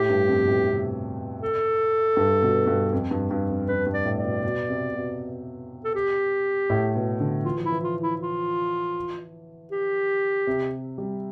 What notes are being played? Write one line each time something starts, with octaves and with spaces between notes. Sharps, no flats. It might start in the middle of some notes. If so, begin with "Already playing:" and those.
Already playing: A2 G4
G2
F2
B2
A2
C3
A4
G2
B2
G2
F2
G2
G2
F2
F2 B4
G2
D5
A2
D5
B2
B2
C3
B2
A4
G4
A2
B2
D3
E3 F4
F3
E4
E3
F4
E4
F4
G4
C3
G3